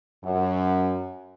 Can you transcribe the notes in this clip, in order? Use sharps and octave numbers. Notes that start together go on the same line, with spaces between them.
F#2